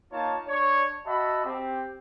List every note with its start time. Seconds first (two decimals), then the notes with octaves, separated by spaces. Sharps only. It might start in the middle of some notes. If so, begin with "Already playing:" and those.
0.12 A#3 D#4 F4 C#5 A5
0.48 D4 C#5
1.07 F#4 D#5 E5 A5 B5
1.45 C4 G4